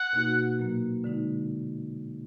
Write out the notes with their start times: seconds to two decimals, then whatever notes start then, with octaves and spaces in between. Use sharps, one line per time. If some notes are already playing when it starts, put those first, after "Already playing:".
Already playing: F#5
0.13 B2 A#3 D#4 F#4
0.59 A#2 F#3 A#3
1.04 D3 G#3 D#4